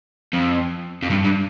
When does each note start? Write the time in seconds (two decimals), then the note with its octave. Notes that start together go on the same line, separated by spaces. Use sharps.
0.33 F2
1.02 F2
1.10 G2
1.24 G2